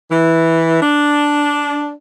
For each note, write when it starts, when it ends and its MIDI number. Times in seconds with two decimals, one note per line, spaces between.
0.11 0.79 52
0.82 1.91 62